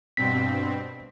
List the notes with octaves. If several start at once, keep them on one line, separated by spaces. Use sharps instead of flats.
G2 B2 C4 B6